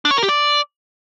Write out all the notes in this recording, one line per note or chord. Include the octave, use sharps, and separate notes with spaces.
D4
C#5
A#4
G4
D5